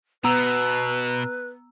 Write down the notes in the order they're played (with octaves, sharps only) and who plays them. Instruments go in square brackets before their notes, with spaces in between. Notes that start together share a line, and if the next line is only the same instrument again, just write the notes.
[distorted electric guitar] B2 [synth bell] B3 A#5 E6 [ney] B4